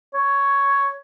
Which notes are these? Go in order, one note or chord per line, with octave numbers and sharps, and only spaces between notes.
C#5